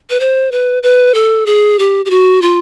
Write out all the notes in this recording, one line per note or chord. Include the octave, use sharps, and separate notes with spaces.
B4
C5
B4
B4
A4
G#4
G4
G4
F#4
F4